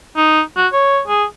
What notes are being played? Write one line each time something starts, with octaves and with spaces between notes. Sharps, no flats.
D#4
F#4
C#5
G#4